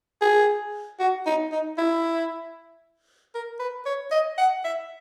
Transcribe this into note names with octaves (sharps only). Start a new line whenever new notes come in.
G#4
F#4
D#4
D#4
E4
A#4
B4
C#5
D#5
F#5
E5